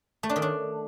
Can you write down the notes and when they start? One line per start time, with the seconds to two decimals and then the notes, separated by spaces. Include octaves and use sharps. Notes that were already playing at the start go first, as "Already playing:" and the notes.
0.23 A3
0.30 D4
0.36 D#3
0.42 D4